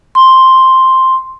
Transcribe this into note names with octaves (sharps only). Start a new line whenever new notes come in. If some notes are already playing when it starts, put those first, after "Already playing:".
C6